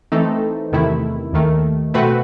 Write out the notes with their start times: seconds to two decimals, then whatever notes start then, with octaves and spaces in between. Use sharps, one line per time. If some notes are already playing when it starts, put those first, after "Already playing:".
0.12 E3 A3 C4 D#4 A4
0.72 E2 C3 D#3 A3 E4
1.33 D#2 D#3 A3
1.94 B2 A3 C4 F#4 B4